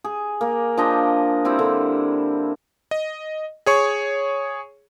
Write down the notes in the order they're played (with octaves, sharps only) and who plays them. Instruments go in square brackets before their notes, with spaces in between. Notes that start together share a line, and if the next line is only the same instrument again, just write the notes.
[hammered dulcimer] G#4
A#3
F3 D4 D#5 G5
G3 C4 E4
D3
[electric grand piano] D#5
G#4 C#5 C#6